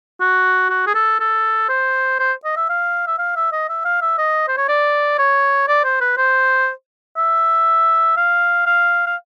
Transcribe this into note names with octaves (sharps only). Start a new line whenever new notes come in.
F#4
F#4
G#4
A4
A4
C5
C5
D#5
E5
F5
E5
F5
E5
D#5
E5
F5
E5
D#5
C5
C#5
D5
C#5
D5
C5
B4
C5
E5
F5
F5
F5